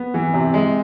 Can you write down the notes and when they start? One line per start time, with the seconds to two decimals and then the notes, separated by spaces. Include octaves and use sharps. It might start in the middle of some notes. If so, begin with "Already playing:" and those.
Already playing: B3
0.14 E3
0.34 C3
0.54 G#3